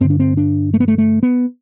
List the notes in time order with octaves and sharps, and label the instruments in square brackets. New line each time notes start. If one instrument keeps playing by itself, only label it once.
[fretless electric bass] G2 D3 C4
D4
C4
D4
A3
B3
A3
A3
B3